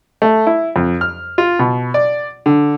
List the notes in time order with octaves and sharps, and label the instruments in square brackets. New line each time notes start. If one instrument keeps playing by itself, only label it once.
[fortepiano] A3
E4
F2
F6
F4
B2
D5
D3